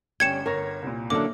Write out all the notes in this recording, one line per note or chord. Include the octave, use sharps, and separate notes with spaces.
G1 G3 C#4 G5 G#6 C#7 E7
G1 A#4 C#5 A#6
C2 A#2
D3 F#3 A#3 D4 E4 D6